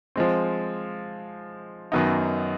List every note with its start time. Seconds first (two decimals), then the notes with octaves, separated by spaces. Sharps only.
0.16 F3 G#3 C4
1.92 F#2 D#3 F#3 B3 D#4